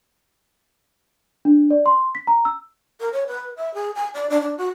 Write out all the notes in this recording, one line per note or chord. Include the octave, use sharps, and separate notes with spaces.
D4
D5
C6
B6
A#5
E6
A#4
C#5
B4
E5
G#4
G#5
D5
D4
D4
F#4